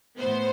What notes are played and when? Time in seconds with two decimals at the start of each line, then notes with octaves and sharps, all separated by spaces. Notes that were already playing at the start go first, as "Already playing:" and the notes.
0.18 A2 E3 B3 C5